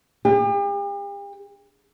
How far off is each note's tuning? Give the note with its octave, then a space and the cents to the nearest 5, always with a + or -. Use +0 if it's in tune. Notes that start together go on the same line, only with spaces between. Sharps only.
G4 +40